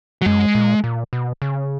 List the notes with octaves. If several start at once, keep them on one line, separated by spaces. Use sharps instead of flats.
F#3
F#2 G#3
A#2
A#2
B2
C#3